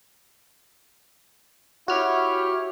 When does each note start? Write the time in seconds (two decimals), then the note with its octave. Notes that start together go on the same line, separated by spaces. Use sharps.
1.88 E4 F#4 G4 C#5 F6